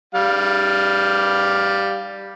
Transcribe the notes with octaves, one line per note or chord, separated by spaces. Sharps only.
G3 F5